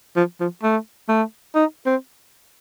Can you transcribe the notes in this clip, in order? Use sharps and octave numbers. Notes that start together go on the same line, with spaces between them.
F3
F3
A3
A3
D#4
C4